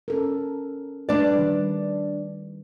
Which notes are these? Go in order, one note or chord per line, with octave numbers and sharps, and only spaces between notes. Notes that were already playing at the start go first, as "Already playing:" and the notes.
C#4 A4 A#4
G3 A3 D4 B4 D5
D#3 G3